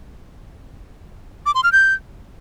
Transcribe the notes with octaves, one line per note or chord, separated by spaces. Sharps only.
D6
C6
F6
G6